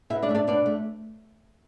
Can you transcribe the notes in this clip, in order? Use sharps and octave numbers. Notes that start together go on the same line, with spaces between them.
B2 E4 E5
D4 D5
A3 E5
D4 D5
B2 D4 D5
A3